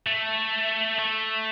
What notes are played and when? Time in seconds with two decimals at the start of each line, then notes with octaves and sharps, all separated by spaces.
0.07 A3
0.99 A3